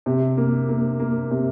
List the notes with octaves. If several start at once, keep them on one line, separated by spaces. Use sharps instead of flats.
C3
A#3
A#3
A#3
C3